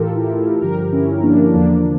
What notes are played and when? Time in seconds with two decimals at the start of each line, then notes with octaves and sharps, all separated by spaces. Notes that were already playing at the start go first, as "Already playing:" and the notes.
Already playing: A2 E3 F4 G4 A4 A#4
0.15 E4 G4
0.28 F4
0.38 E4 G4
0.61 G2 D3 F3 G4 A#4
0.92 C#4 E4
1.22 A#3 D4
1.53 E2 D3 F3 A#3 D4